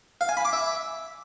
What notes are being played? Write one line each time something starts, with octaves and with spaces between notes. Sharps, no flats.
F5
G#5
B5
D6
E5